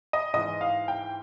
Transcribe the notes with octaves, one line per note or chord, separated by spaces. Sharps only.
D#5
G#2 E3 D#5
F5
G5